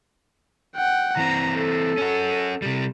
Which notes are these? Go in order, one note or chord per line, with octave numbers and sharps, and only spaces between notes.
F#5 G5
E3 C4 A#5
A4
C#4 F#4
C3 G3